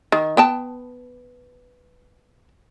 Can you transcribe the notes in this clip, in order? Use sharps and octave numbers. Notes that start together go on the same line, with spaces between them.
D#3
B3 G5 A5